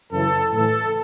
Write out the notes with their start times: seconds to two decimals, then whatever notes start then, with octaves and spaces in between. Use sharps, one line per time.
0.12 F#2 C#3 E3 A4
0.53 A2 E3 A4